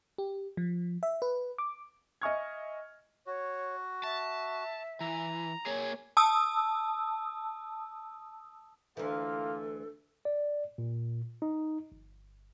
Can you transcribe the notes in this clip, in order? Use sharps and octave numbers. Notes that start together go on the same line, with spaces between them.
G4
F3
E5
B4
D6
D#5 E5 G#5 C#6 F6 G#6
F#4 C#5
E5 A5
E3 A#5
A#3 G#4 C#5
A5 D#6 E6
D2 E3 A#3 F4 A4
D5
A#2
D#4
G1